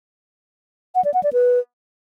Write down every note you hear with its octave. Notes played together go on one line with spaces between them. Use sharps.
F#5
D5
F#5
D5
B4